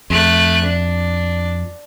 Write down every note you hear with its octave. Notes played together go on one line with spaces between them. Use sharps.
F2 A3 F#6
D4